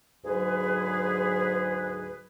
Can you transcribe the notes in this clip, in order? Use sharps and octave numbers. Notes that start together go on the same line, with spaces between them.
D2 G#2 F#3 G#4 B4